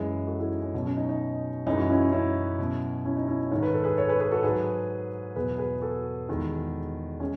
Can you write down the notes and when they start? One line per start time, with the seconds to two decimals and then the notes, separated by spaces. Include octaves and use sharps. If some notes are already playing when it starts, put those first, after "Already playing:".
Already playing: F#2 E3 G#3
0.27 F#4 A4
0.39 E4 G#4
0.50 D#4
0.62 C#4
0.74 B2 F#3
0.86 C#4
0.97 D#4
1.09 D#4
1.67 F#2 E3 G#3 D#4
1.78 F#4
1.90 C#4 E4
2.12 C#4 E4
2.58 B2 F#3
3.05 C#4 E4
3.17 D#4
3.28 C#4 E4
3.51 G#2 D#3 G#3 C#5
3.63 B4
3.74 A4
3.84 G#4 B4
3.98 A4 C#5
4.08 G#4 B4
4.20 G#4 B4
4.31 F#4 A4
4.43 G#2 F#3 G#4 B4
5.35 E2 B2 F#3 G#4 B4
5.58 G#4 B4
5.81 F#4 A4
6.29 E2 D#3 G#3
7.20 G#3 C#4